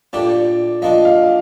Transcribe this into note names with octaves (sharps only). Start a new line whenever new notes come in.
A#2 A3 D4 G4 D5
F3 A#3 D4 D#5
F5